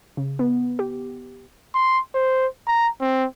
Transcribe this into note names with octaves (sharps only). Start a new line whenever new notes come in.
C#3
B3
G4
C6
C5
A#5
C4